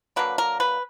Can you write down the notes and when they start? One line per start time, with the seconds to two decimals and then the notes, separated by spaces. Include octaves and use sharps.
0.16 D3 F#3 A#3 B4
0.38 A#4
0.60 B4